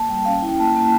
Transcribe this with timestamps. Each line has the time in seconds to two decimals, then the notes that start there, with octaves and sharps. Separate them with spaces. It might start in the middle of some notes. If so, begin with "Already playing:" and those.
Already playing: A#3 A5
0.09 G3 G5
0.25 C#4 F5
0.42 E4 G5
0.59 A#3 A5
0.76 A#3 A5